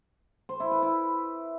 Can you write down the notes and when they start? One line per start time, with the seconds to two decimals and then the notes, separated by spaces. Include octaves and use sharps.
0.49 C5
0.60 E4
0.71 B4
0.82 E4